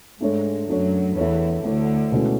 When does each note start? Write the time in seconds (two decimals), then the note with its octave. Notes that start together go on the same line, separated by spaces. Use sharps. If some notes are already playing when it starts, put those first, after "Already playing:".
0.21 G#2 G#3 A3 D4 A4 C#5
0.68 F#2 F#3 A3 D4 A4 C#5
1.16 E2 E3 A3 E4 A4 C#5
1.64 D2 D3 A3 E4 A4 C#5
2.12 B2 G#3 C#4 E4 A4